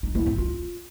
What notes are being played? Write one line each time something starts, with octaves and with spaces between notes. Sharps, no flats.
D#4
E4
C4
F4